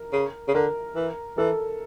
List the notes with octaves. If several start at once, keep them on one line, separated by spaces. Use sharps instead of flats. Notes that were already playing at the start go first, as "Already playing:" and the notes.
Already playing: A#4
C#3
C#3
D3 A#4
E3
E3 A4